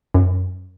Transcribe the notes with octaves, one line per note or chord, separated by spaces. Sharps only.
F#2